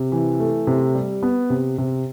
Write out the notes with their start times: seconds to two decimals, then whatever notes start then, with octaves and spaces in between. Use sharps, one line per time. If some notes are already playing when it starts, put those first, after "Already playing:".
Already playing: C3
0.12 E3
0.40 A3
0.67 C3
0.95 G3
1.23 B3
1.50 C3
1.78 C3